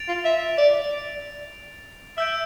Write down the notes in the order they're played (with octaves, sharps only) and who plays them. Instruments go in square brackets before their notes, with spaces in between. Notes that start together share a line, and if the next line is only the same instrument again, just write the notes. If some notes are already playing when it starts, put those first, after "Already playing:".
Already playing: [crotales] A6 D7 F7
[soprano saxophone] F4
E5
D5
[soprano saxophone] E5 [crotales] E6 G6 D7